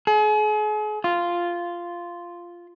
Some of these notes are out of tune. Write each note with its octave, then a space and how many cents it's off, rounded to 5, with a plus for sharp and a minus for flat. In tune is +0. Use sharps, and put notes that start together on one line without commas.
G#4 +40
F4 -5